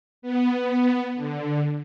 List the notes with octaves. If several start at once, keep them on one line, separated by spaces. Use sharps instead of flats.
B3
D3